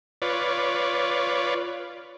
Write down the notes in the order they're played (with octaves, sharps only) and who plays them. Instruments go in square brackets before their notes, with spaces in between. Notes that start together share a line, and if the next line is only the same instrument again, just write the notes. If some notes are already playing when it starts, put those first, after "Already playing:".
[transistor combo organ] F4 B4 C#5 D5